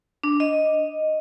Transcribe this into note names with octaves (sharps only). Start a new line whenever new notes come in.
D4
D#5